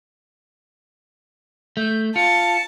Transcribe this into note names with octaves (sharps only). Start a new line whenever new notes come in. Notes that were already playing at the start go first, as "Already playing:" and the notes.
A3 G6
F4 A5 C#7